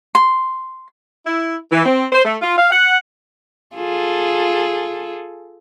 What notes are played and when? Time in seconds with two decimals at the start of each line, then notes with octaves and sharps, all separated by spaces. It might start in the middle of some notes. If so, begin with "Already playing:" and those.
0.15 C6
1.26 E4
1.72 E3
1.86 C4
2.13 C5
2.25 A3
2.42 F4
2.58 F5
2.71 F#5
3.76 F4 G#4 A4